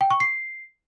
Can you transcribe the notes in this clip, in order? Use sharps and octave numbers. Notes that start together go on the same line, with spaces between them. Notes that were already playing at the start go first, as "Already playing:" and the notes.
G5
C#6
C7